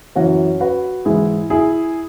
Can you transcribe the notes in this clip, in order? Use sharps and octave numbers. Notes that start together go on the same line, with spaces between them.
F#2 E3 C#4 F#4
F#4 B4
G#2 E3 E4 G#4
E4 G#4